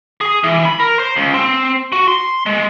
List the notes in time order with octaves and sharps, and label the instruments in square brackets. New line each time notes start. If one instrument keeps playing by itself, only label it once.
[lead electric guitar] G#4
E3
B5
A#4
C5
C#2
C4
F#4
C6
G#3